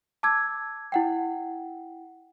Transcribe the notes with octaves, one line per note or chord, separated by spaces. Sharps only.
A5 D6 E6 G#6
E4 F#5 G5